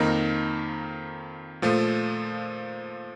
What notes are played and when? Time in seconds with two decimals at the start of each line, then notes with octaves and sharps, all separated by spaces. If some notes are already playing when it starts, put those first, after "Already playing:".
Already playing: F2 D#3 A#3 D#4 A#4
1.62 A#2 F3 A3